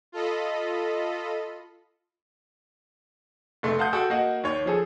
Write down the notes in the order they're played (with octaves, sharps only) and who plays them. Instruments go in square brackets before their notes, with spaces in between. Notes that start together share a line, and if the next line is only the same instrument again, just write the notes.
[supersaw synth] F4 A4 D#5 B5
[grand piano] F1 A3 C6
F5 F#5 A5 C6 D#6 G6
F#4 A4 G5
A#3 F#4 D#5 F#5
D#2 C#5
F3 G#4 A4